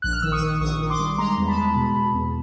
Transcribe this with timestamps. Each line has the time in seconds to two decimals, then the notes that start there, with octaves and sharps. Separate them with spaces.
0.02 A#1 F#6
0.13 F6
0.22 D#3 E6
0.32 C#6 D#6
0.42 D#3
0.61 A#1 C#6 D#6
0.80 D#3
0.90 C6 D6
1.00 G3
1.18 G#3 A#5 C6
1.38 E2
1.47 A5 B5
1.57 G#3
1.76 B2
1.96 B2
2.14 E2